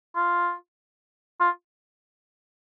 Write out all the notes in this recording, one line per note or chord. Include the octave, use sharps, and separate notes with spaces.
F4
F4